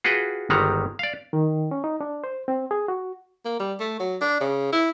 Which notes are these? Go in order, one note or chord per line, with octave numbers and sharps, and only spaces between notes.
F4 F#4 G#4 B4 G5
G1 D#3 G3 G#3 F#5 A#5
D5 F5
D#3
C#4
D#4
D4
C5
C4
G#4
F#4
A#3
G3
A3
F#3
D4
C#3
E4